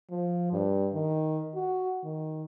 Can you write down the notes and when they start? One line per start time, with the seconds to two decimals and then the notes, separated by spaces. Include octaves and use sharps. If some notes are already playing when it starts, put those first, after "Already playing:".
0.10 F3
0.52 G2
0.93 D#3
1.55 F#4
2.04 D#3